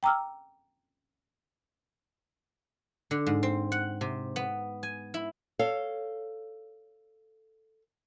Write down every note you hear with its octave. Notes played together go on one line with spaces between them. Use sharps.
G5 A#5 D6 E6 F6
D3
G#2
C4
F#5
C3
B3
G#5
E4
A4 C#5 F5